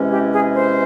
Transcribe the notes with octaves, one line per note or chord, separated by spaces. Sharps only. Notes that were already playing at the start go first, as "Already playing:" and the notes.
Already playing: E2 C3 E3 G#3 C#4
G4
G#4
C5